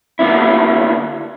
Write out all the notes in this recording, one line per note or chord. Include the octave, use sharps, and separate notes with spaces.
D3 A#3 B3 D4 E4